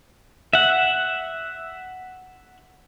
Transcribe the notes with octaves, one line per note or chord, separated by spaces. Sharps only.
E5 F#5